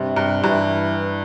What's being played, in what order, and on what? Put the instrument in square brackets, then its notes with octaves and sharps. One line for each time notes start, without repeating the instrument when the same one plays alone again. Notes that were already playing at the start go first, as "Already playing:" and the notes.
Already playing: [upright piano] G2 [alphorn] C3
[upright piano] G2
[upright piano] G2 [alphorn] E3